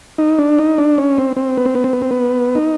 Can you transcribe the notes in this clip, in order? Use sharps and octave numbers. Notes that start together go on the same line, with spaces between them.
D#4
D4
D#4
D4
C#4
C4
C4
B3
C4
B3
C4
B3
C4
B3
D#4